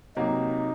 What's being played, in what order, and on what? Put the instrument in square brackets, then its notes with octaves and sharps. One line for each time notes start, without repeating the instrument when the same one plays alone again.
[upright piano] C3 F#3 A#3 [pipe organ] D#4